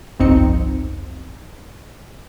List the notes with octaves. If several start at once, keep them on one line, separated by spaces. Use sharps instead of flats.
G1 C2 F2 C4 D#4 C#7